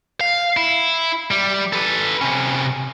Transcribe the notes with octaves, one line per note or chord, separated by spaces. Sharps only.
F5
E4
G3
A4 B4
C3 C#4